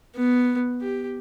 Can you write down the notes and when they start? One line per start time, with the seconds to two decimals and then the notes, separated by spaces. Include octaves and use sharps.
0.15 B3
0.81 G4